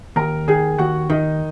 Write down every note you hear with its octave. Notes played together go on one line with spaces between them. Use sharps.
D#2 A#4 A#5
D#3 G#4 G#5
D#2 F#4 F#5
D#3 D#4 D#5